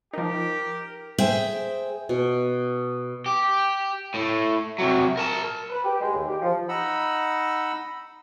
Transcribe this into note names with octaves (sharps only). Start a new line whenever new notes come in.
F3 D#4 G4 A#4
G#4 C5 E5 G5
B2
G4
A2
C3 F#3
A#4 A5
B4
G4
G#3
D#2
G4
F3
D#4 D#5 F#5 B5 E6